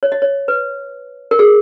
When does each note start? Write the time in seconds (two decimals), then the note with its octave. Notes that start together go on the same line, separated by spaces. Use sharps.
0.03 C#5
0.12 D#5
0.22 C#5
0.48 B4
1.31 A#4
1.39 G#4